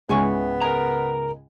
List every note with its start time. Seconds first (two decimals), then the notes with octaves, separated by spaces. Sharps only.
0.09 C#2 G#2 C#3 E3 B3 G#5 C#6
0.61 G#3 A#4 A#5